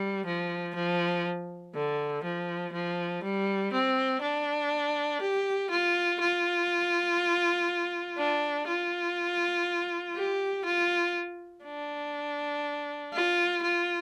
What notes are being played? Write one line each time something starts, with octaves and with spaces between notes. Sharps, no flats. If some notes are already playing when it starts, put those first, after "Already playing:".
Already playing: G3
F3
F3
D3
F3
F3
G3
C4
D4
G4
F4
F4
D4
F4
G4
F4
D4
F4
F4